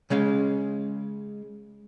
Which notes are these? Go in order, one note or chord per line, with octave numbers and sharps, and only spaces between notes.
C#3 G#3 C#4 F5